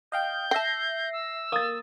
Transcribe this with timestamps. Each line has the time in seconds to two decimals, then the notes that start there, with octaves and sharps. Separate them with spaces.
0.12 D#5 F5 G5 G6
0.51 E5 G5 A5 A#6 C7
1.13 E6
1.52 A#3 D#6 A6